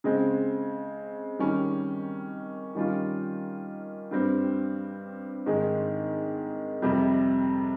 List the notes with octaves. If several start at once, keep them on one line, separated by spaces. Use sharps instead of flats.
C#3 G#3 C4
D#3 G3 C#4
D#3 G3 C#4 F4
G2 G3 C4
G#2 D#3 G#3
F2 C3 G3